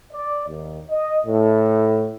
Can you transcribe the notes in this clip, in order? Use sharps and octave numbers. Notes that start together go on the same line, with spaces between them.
D5
D#2
D#5
A2